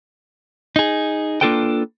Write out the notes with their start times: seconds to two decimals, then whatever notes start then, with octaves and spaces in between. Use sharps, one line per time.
0.76 D#4 G#4
1.41 A#3 D4 F4 A4 B4 G5